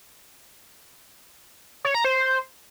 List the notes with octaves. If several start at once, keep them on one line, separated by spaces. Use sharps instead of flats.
C#5
A#5
C5